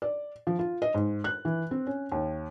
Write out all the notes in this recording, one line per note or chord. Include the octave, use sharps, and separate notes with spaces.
D5
F3
F4
D#5
G#2
F#6
E3
C4
C#4
D#2